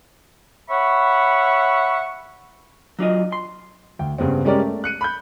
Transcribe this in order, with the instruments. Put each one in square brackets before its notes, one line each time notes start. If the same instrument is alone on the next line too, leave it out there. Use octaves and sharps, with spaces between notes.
[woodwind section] C#5 E5 F#5 B5 C#6
[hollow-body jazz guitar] F#3 D4 F4 D#5
C6
[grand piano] D2 G5
G2 C#3 B3 C4
G3 G#3 C#4 G4 A#4 D5
A3
F#6 C#7 D#7
B5 F#6 G6